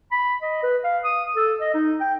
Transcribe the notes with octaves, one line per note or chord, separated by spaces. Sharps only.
B5
D#5
B4
F5
D#6
A4
D#5
D#4
G5